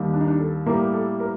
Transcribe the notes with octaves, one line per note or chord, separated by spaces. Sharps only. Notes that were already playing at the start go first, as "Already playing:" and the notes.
Already playing: D#2 D#3 G3
D4
D#4
D4
A4
A2 G3 A#3 A#4
A4
A#4